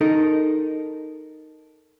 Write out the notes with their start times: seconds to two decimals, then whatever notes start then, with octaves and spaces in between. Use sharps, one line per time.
0.01 D#4 A4 A#4